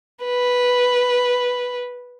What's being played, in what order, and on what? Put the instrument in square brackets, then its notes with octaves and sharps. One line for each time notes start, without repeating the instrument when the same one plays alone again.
[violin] B4